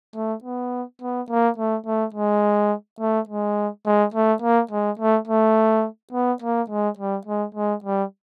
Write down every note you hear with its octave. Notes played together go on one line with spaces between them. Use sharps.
A3
B3
B3
A#3
A3
A3
G#3
A3
G#3
G#3
A3
A#3
G#3
A3
A3
B3
A#3
G#3
G3
G#3
G#3
G3